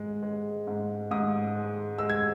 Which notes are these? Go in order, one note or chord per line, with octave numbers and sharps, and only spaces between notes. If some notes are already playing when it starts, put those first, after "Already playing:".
Already playing: G#2 G#3
G#3
G#2
G#2 D#6
G#3
G#3 E6
G#6